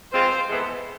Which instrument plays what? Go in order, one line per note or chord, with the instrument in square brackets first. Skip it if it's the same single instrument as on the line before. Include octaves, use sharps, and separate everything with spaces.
[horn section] F3 G#3 C4 F4 [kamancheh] C5
[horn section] E3 G#3 B3 E4 A4